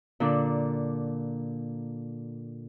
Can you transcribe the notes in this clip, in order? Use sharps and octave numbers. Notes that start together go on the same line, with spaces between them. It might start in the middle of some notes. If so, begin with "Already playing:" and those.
A#2 D3 D4